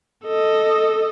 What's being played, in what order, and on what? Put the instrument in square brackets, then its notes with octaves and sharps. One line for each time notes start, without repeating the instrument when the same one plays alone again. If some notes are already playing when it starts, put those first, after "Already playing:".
[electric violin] A4 D#5